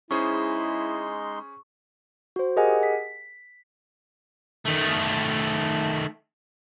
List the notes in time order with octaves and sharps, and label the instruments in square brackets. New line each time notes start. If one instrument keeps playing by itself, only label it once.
[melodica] G#3 D#4 C6 [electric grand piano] C#4 G#4 C5 [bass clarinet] E4 [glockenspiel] C#6
[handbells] F#4 C5
G4 G#4 A#4 D#5 F#5 G#5
B6
[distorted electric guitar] D#3 A3